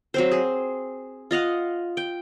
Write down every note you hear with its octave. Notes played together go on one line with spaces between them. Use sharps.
F#3 C4 C5
G#4
F4 D#5 F5 F#5
G5